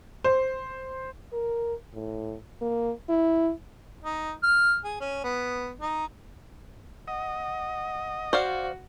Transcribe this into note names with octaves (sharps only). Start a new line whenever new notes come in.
C5
A#4
A2
A#3
E4
D#4
F6
G#4
C#4
B3
D#4
D#5 F#5
F#4 C5 D5 F5